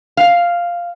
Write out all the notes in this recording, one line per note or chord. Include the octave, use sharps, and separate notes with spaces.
F5